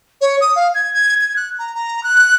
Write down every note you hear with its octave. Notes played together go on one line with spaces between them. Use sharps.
C#5
D#6
F5
G#6
G#6
G#6
F#6
A#5
A#5
F#6